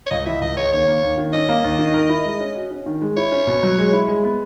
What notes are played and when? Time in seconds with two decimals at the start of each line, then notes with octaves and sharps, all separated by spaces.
0.06 C#5
0.10 C#2 D#5
0.26 E3 E5
0.41 C#2 D#5
0.56 C#3 C#5
0.72 D#2 C#5
0.87 A#3
1.03 D#2
1.18 D#3
1.33 C#4 D#5
1.49 A#3
1.64 D#2
1.79 D#3
1.94 A#4
2.09 E4
2.25 G#3
2.40 C#4
2.56 F#4
2.71 C#4
2.86 D#3
3.02 G#3
3.17 E4 C#5
3.32 C#4
3.47 B2
3.63 F#3
3.79 G#3
3.93 E4
4.08 G#3
4.24 B3